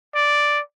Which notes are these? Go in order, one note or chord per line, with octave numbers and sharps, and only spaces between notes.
D5